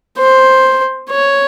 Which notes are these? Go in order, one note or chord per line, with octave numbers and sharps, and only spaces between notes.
C5
C#5